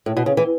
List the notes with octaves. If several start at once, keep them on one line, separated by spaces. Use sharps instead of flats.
A2
B2
C#3
E3